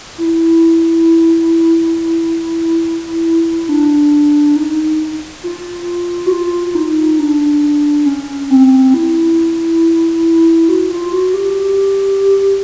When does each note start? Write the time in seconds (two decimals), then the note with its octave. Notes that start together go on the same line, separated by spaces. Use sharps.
0.18 E4
3.69 D4
4.56 D#4
5.43 F4
6.26 F#4
6.32 F4
6.75 D#4
7.19 D4
8.06 C#4
8.50 C4
8.94 E4
10.69 F#4
10.91 F4
11.12 F#4
11.34 G4